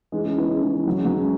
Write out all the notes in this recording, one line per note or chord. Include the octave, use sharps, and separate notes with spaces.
E3 G#3
G#3 C#4
B3 E4
G#3 C#4
E3 G#3
E3
F#3
G#3 C#4
F#3 B3
G#3 C#4